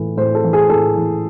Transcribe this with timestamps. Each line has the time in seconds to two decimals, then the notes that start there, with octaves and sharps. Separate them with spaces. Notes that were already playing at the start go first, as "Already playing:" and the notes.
Already playing: A2 E3
0.17 A2 C5
0.35 A4
0.44 E3
0.53 G#4
0.69 A2 A4
0.96 E3